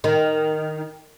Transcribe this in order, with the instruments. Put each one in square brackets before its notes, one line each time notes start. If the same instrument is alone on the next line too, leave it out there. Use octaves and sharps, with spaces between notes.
[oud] D#3